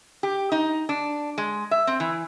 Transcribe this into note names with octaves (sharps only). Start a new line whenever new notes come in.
G4
D#4
D4
G#3
E5
C4
E3